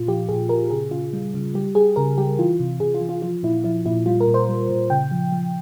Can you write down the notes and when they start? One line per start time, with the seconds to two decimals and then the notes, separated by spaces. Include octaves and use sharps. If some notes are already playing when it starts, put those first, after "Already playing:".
Already playing: A#2 F4
0.08 F3 G4
0.29 A#2 G#4
0.49 A#2 A#4
0.70 C#3 G#4
0.91 C#3 F4
1.13 G3
1.34 C#3
1.54 G3 G4
1.75 G3 G#4
1.96 C#3 A#4
2.18 G3 G4
2.39 E3 F4
2.60 C3
2.80 C3 G#4
2.94 F4
3.01 E3
3.09 F4
3.22 F3 F4
3.43 A#2 E4
3.64 F3 E4
3.86 A#2 E4
4.06 G3 F4
4.20 A#4
4.28 A#2
4.34 C5
4.49 G3
4.69 A#2
4.90 C#3 G5
5.11 F3
5.32 F3